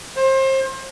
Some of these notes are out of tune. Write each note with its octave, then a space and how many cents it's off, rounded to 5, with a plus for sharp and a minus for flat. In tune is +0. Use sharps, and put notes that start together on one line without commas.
C5 +30